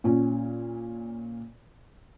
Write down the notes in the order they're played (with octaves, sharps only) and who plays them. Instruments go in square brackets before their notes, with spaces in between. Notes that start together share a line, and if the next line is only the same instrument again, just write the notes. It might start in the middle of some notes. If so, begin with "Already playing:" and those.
[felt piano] A#2 C#4